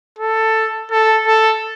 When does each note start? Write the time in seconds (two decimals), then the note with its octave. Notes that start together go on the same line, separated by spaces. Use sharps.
0.19 A4
0.91 A4
1.27 A4